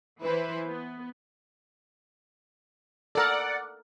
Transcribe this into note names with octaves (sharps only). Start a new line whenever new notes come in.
E3 E4 B4 C5
B3
A4 A#4 D5 F#5